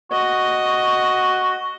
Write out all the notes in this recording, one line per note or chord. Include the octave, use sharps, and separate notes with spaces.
F#4 D#5